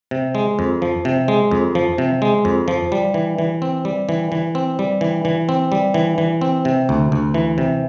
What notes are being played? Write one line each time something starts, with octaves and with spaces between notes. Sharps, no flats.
C3
G#3
F2
F3
C3
G#3
F2
F3
C3
G#3
F2
F3
G3
E3
E3
C4
G3
E3
E3
C4
G3
E3
E3
C4
G3
E3
E3
C4
C3
D2
D2
E3
C3